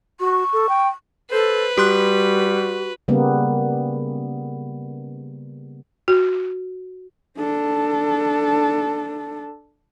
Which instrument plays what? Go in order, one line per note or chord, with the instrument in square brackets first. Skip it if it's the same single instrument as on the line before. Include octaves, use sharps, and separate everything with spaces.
[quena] F#4 [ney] C#6
[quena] A4
G5
[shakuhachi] A4 [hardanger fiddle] B4 [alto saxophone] C5
[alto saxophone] G3 [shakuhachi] F#4 [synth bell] G4 C6 F#6
[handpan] C#3 G3 A#3 B3
[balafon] F#4
[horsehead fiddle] D4 A4